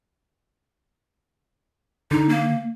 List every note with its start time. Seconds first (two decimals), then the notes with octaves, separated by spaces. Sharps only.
2.11 D3 D#4
2.29 A#3